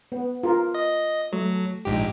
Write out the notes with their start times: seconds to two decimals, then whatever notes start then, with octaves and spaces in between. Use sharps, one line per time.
0.12 B3
0.43 F4 G4 A#4
0.74 D#5
1.32 F#3 A3
1.85 A#1 G#2 G4